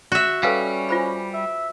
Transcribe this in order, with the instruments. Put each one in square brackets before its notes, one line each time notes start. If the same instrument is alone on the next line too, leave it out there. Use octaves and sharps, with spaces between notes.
[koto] F#4 E5
[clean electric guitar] G3 [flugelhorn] C#4 [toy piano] A4 B4 F5
[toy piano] F4 C5 B5
[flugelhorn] E5